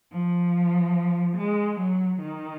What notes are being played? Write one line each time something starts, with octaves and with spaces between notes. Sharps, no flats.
F3
G#3
F#3
D#3